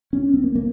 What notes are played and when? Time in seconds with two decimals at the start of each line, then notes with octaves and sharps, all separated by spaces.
0.13 C#4
0.34 C4
0.44 A#3
0.55 A#3